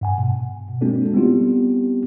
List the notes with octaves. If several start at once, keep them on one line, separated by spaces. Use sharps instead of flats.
G2 F#5 G#5
B2
G#3 A#3 C4 D4 F#4 A4
G3 B3 C4 E4 F4 G4